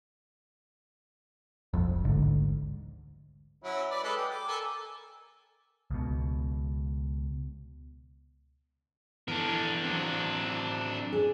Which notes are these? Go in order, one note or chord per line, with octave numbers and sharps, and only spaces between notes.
F1 B1 F2
A1 D2 G#2 D3
F#3 C#4 E4
B4 D5
G#3 A4 B4
G4
D6
A4 A#4 G#5
C#2 B2
E3 B3 D4 A4 A#4
F#3 C4
G#4